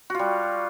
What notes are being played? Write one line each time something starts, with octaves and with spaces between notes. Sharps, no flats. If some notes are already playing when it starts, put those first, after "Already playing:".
G3 F4 F#4